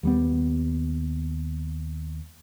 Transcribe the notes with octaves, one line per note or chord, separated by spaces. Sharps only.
D#2 G3 B3